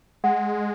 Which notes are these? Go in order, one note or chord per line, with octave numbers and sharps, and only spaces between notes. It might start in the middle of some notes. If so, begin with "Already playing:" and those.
G#3 F#5